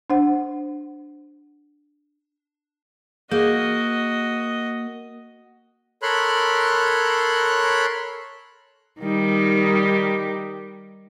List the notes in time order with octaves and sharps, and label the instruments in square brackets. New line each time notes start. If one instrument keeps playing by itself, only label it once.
[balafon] D4 C5 F#5
[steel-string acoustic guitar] A#3 [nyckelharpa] F#4 D#5 [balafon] G#4
[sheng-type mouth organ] A4 A#4 C#5 B5 C6 F#6
[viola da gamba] D#3 G3 D#4